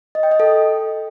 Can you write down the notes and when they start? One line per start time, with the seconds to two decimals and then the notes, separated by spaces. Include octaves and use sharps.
0.15 D#5
0.23 G5
0.31 D#5
0.40 A4